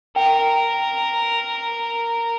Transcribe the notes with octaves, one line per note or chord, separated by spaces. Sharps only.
A#4 G5